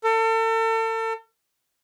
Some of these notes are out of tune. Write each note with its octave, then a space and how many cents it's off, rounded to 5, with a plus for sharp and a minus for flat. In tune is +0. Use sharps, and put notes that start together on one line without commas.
A4 +35